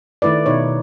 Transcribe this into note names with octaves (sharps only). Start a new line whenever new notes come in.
D#3 A3 E4 B4 D5
B2 D#4 C#5